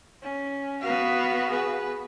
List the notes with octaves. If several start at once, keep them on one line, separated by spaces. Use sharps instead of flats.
C#4
B3 F#4 B4 F5
G#4 B4